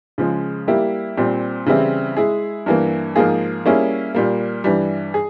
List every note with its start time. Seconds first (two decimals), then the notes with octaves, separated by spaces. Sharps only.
0.18 C#3 F3 G#3
0.68 G3 A#3 E4 G4
1.17 A#2 G3 C4
1.66 C#3 E3 G3 C4 E4
2.17 G#3 E4 G#4
2.66 G2 E3 A#3
3.16 G#2 F3 A#3 F4 G#4
3.66 G3 A#3 C#4 E4 G#4
4.15 A#2 G3 A#3
4.64 G2 E3 G3
5.14 G#4